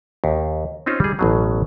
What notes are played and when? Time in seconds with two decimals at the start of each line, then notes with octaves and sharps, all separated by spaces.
0.24 D#2
0.86 C4 C#4 D#4 F4 C5 F5
1.00 G3 G#4
1.19 A1 B2 F#3